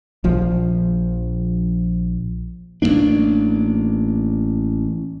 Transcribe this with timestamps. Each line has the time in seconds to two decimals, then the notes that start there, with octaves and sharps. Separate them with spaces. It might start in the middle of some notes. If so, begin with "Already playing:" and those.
0.24 A#1 F3
2.82 A1 F3 A#3 D4